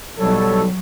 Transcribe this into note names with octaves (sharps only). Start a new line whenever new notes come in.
B1 F#3 G3 A4 C#5